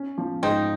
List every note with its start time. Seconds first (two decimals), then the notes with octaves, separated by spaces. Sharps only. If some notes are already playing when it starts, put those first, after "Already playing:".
Already playing: C#4
0.18 F3
0.43 G#2 C4 D#4